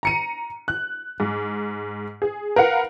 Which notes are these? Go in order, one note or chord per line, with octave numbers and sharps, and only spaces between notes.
A#5 C#7 D#7
F#6
G#2
G#4
A#4 B4 F5 F#5